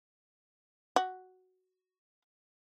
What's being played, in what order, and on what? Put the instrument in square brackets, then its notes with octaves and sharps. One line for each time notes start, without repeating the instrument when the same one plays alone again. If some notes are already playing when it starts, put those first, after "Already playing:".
[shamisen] F#4